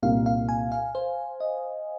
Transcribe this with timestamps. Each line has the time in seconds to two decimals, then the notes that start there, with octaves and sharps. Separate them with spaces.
0.02 C2 A#2 A#3 D#4 F5
0.26 F5
0.49 G#5
0.72 F5
0.95 C5
1.40 D#5